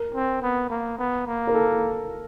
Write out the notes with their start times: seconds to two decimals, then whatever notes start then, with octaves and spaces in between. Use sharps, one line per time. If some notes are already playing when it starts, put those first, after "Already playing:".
Already playing: A#4
0.15 C4
0.42 B3
0.70 A#3
0.99 B3
1.27 A#3
1.47 A#4
1.54 A4